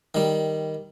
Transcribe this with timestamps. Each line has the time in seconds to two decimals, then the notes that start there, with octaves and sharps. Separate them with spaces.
0.14 D#3 G3